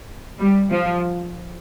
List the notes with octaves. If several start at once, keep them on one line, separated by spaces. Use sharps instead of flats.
G3
F3